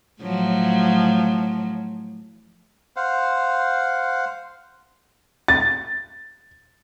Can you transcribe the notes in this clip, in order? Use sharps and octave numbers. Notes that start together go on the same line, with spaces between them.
A2 F3 F#3
C5 F5 F#5
A6